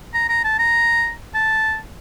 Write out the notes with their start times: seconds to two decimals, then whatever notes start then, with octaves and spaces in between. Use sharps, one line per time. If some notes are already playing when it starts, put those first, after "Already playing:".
0.14 A#5
0.29 A#5
0.45 A5
0.59 A#5
1.35 A5